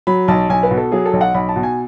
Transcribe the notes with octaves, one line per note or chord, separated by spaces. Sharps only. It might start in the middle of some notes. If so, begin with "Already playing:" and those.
F#3 B5
B1 A5
B1 G#5
B4
B2
A4
F#3 G#4
A4
B1
F#5
B1 B5
A5
B2
G#5